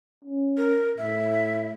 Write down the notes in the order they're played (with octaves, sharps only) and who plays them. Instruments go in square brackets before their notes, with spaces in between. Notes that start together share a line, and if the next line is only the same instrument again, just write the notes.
[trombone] C#4
[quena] A#4
[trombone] A2 [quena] E5